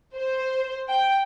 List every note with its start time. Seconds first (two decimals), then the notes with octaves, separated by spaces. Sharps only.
0.15 C5
0.89 G5